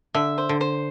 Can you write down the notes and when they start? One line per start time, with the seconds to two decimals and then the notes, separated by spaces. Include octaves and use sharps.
0.14 D3 E5
0.38 C5
0.49 D3
0.61 C5